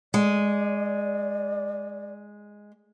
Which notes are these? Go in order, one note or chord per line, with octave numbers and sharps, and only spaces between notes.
G#3 D5